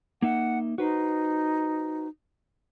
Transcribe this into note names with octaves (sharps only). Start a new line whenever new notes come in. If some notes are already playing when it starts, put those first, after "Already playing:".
A#3 D#4 E5 F#5
D#4 F#4 B4 C5